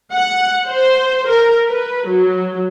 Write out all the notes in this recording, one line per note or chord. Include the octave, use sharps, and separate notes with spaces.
F#5
C5
A#4
B4
F#3